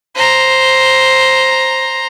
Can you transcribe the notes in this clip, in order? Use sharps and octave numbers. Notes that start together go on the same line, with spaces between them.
C5 A#5